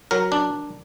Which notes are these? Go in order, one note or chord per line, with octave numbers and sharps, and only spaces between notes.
F#3 A#4
D4